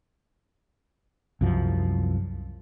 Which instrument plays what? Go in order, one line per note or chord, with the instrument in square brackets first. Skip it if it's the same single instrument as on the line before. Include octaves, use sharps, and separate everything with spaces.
[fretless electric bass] C2 F#2 F3